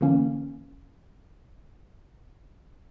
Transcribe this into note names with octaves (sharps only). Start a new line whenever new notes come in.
D3 E3 A#3 C#4